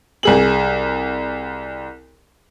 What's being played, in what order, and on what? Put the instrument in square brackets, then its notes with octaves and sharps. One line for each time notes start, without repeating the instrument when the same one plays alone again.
[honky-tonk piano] C2 G#4 F#7